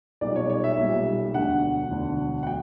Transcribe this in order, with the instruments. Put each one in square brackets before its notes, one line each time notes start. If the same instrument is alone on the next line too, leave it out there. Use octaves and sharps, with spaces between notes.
[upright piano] B1 A#2 G3 D5
C#5
C#5
E5
B1 A#2 G3
E1 D2 D3 F#5
E1 D2 D3
F#5
F#3 G5